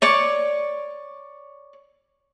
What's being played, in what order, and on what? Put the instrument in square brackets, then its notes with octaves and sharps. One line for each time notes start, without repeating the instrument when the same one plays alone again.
[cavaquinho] C#5 D5 C#6